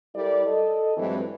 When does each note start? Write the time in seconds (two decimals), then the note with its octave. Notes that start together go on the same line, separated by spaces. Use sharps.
0.15 G3 E4 A4 A#4 D5
0.46 A4 D#5
0.97 G2 E3 F#3 G#3 C4